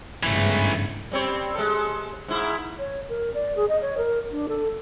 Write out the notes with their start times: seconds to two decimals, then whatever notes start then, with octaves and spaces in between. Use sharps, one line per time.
0.23 G1 G#2 C#3 E3 A3
1.11 G3 C4 C#5
1.55 G#3 A4
2.28 G#2 E4
2.79 C#5
3.09 A#4
3.34 D5
3.56 G#4
3.69 D#5
3.82 C#5
3.98 A#4
4.32 D4
4.49 A4